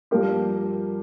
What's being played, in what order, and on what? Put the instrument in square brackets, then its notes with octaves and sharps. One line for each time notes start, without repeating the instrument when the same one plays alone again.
[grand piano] G2 F3 A#3 G4